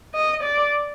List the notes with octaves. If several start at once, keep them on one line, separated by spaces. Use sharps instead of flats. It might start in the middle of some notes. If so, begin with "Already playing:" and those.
D#5
D5